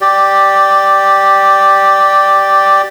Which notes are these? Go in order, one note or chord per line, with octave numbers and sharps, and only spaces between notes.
G4 D5